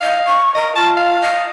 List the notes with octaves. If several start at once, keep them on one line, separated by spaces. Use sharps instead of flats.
D#5 F5
C#6
A#4 D#5
F4 A5
F5
D#5